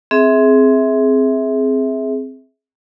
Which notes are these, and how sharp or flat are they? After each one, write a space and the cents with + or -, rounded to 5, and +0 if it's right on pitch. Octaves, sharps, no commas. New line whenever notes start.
C4 +0 G#4 +15 E5 -20